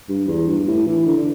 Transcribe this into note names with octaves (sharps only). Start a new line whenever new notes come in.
G2
E2
G2
A2
E3
D3
D3